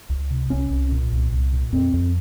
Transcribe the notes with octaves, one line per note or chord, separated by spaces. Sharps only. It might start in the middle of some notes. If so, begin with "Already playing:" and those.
C#2
C3
C2 C#4
C2
A#2
C2
C2
A#2
F2 C4
F2